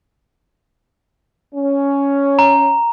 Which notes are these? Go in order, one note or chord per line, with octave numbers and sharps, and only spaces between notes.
C#4
A#5